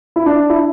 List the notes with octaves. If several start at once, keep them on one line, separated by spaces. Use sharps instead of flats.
E4
D4
E4